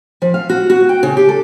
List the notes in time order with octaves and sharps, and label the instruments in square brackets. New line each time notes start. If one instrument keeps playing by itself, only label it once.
[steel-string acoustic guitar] F3
F5
F#4
F#4
G5
C#3
G4
A4